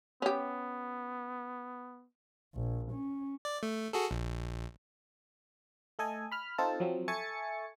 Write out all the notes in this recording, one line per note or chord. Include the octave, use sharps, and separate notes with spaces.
B3 C#4 G4
A#1
C#4
D5
A3
F#4 G#4 A4
A#1
A3 A4 D#5 G#5
B5 F6
C4 D#4 F4 A4 A5
F3 F#3 C4
A4 E5 G#5 C#6 A6 C#7